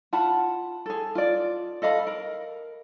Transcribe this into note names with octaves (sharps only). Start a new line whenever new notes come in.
F4 F#5 A5 B5
G#4 A4
F4 D5
A4 D#5 F5 B5
A#4